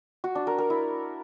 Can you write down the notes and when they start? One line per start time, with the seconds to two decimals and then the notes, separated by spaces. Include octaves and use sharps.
0.24 F#4
0.35 D4
0.47 A#4
0.58 A#4
0.70 E4